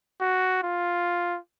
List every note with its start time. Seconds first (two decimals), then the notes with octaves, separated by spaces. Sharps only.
0.20 F#4
0.63 F4